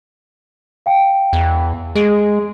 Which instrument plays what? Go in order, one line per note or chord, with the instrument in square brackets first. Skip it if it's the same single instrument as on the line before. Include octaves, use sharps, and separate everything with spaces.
[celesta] F5 G5
[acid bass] E2
[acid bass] G#3 [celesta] G#4 D7